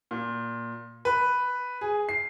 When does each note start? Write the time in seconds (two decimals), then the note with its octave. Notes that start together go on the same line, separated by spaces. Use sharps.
0.11 A#2
1.05 B4
1.81 G#4
2.09 C7